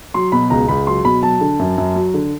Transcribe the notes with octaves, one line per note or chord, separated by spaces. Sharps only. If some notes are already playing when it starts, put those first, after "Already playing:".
F#3 C6
B2 B5
C#2 A#5
C#2 B5
F#3 C6
B2 B5
F#3 A5
D3
F#2
F#2
F#3
D3